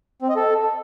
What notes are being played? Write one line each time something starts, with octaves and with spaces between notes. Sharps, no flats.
C4
D#5
A4